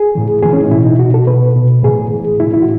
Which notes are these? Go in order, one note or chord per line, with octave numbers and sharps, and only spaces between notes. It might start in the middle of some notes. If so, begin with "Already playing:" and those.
Already playing: G#4
A2 E3
A2 E3 G#4
C#4
D#4
B2 E4
D#4
B2 F#4
A4
B2 B4
B2
A2 E3 G#4
A2 E3
A2 E3 E4
E4
F#4